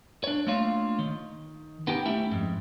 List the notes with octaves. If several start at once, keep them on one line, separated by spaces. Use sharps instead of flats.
D4 C#5
A3 A#3 D4 F4 C#5 F5
D#3
B3 D#4 G4 G5
A3 C#4 E4 G4 E5 G5
F2 G#2